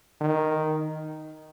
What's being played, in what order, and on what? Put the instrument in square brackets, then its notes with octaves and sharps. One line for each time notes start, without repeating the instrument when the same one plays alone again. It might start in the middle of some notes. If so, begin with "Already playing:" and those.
[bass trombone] D#3